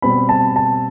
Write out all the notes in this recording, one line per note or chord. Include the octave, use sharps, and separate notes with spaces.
B2 G3 C4 B5
A5
A5